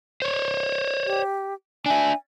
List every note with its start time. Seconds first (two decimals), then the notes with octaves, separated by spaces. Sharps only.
0.22 C5 C#5
1.06 G4
1.86 D4 E5 G#5